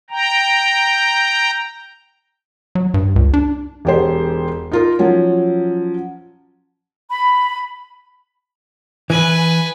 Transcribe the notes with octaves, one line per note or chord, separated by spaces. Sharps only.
G5 A#5
F#3
G2
C#2
D4
E1 G4 C5
D#4 F4 A#4
F3 F#3 C#4
B5
E3 B4 G#5